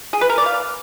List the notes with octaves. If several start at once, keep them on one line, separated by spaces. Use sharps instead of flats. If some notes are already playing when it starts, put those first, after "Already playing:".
G#4
B4
A#4
D5
F5